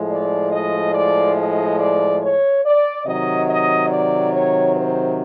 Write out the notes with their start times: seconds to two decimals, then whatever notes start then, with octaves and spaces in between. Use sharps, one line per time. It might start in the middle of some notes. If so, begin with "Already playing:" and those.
Already playing: A2 F3 G#3
0.10 D5
0.52 D#5
0.94 D5
1.37 D#5
1.78 D5
2.22 C#5
2.64 D5
3.06 C3 D#3 F#3 D#5
3.49 D#5
3.90 D5
4.33 C#5
4.75 C5